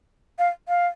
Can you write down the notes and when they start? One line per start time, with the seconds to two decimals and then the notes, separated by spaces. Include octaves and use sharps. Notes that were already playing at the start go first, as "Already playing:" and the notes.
0.39 F5
0.68 F5